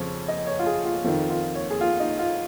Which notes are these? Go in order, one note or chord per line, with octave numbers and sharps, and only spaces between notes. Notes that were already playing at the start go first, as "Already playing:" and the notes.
Already playing: F2 C#3 F3 C#5
D#5
C#5
F4
G#4
F4
F2 D#3 F4
F4
C#5
G#4
F4
D#4
F4